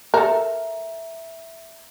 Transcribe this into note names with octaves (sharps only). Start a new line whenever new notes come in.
A4 A#4 E5 A#5